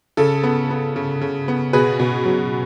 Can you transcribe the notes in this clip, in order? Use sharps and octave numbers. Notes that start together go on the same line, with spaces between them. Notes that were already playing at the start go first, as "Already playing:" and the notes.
C#3 A4
B3
B3
C#3
C#3
B3
B2 G#4 B4
B2
F#3